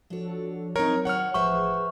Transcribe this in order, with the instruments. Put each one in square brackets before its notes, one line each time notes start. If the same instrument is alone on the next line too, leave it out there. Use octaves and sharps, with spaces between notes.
[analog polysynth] F3 F#4 A4 [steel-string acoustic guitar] D4 C#5
[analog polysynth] F#3 C4 [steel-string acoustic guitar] D#4 C#5 [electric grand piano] A#4
[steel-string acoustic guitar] D#3 C#5 [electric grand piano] F#5 F6
[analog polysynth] A1 F3 G#4 [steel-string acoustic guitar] B4 C5 E5 [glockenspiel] C#6